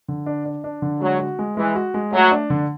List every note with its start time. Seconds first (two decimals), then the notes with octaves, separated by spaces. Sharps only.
0.08 D3
0.26 D4
0.45 D4
0.64 D4
0.82 D3
1.01 F#3 G#3
1.19 F#4
1.39 G#3
1.57 E3 G#3
1.76 F#4
1.94 G#3
2.12 F#3 A3
2.31 D4
2.50 D3